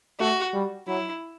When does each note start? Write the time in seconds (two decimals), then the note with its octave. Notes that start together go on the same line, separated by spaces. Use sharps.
0.20 A3 F#4
0.53 G3
0.87 F#3 E4